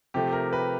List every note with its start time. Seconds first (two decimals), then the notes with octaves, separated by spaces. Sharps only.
0.14 C3 F3 A3 G4
0.33 A#4
0.53 B4